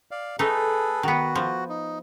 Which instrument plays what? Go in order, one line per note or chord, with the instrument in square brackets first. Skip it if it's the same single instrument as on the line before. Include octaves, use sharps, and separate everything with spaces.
[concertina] D5 F5
[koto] A3 D#4 [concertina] G#4 A4 B4
[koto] D#3 B3 [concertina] F#4
[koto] F3
[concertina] D#4